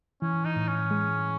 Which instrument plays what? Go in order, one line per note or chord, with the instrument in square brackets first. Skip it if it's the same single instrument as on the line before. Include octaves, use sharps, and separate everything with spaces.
[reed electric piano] E3 [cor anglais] C#4
[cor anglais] D#4
[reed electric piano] A2
[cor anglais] C#4
[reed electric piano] G#3